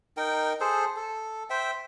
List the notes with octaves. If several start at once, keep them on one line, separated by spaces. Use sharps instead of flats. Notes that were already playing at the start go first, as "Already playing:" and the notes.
D#4 A#4 G5
G#4 A4 C5
A4
C5 E5 G5